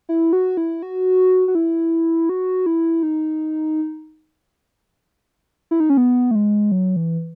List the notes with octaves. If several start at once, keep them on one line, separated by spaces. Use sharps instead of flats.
E4
F#4
E4
F#4
F#4
E4
F#4
E4
D#4
E4
D#4
C#4
B3
A3
G#3
F#3
E3